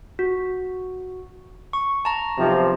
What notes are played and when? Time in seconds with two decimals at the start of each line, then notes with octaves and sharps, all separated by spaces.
0.19 F#4
1.73 C#6
2.05 A5 A#5
2.37 B1 C3 F3